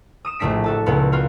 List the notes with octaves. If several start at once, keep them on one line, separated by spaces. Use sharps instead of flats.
D#6 D#7 E7
A#1 A2 A3 D4 B6 D7
F#4 A4 A5
C#2 A#2 B3
F4 F#4 A#4